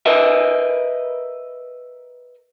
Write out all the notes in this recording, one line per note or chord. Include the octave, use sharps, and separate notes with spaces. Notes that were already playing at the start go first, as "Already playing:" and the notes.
A#4 B4 D#5 E5